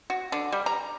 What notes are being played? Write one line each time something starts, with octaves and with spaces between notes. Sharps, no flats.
F#4
D3
G3
A#5